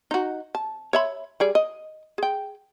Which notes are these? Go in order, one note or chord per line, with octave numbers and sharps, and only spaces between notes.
D#4 F#4
A5
C#5 E5 B5
G3 G#4 D5
D#5
G#4 G5